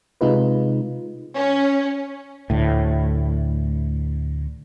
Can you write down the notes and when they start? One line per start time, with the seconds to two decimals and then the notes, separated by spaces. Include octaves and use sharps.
0.21 C3 G#3 D#4 F4 B4
1.35 C#4
2.50 D2 A2